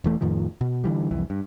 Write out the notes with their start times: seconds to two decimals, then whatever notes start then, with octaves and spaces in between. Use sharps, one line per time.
0.04 E1 E3 A3
0.21 F2 A2 D#3 F3
0.61 B2
0.84 D3 E3 G3
1.11 C2 F2 E3
1.30 G2